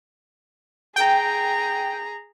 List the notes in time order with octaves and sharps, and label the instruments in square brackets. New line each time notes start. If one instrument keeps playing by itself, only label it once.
[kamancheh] G#4 A#5 [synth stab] G5